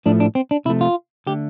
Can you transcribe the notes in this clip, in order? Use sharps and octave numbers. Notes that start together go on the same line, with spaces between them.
A2 F3 A3 D4
D4
C4
D4
C3 F3 A3 E4
F4
D3 A3 G4